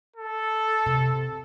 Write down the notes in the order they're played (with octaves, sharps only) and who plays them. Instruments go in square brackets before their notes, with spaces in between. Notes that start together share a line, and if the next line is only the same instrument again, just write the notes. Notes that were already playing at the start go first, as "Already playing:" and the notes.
[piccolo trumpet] A4
[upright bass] C3